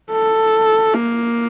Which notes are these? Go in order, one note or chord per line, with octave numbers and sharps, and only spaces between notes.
A4
A#3